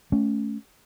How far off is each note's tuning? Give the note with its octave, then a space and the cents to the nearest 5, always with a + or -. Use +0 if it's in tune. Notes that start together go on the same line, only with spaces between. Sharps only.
A3 -15 C#4 +15